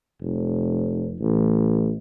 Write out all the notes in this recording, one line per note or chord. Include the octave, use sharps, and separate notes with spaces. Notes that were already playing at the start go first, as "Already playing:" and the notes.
F1
A1